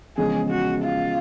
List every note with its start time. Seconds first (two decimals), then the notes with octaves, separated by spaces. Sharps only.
0.17 E2 C#3 F3 G#3 C#4 G#4
0.50 F#4
0.83 F4